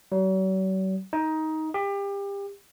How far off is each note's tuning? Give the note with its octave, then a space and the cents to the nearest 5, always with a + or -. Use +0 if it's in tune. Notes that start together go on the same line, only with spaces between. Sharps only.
F#3 +45
D#4 +15
G4 +30